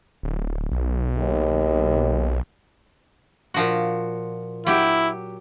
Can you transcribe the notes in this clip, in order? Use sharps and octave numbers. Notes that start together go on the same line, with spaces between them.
D1
B1
D#2
A#2 F3 F#4
F#3 E4 G4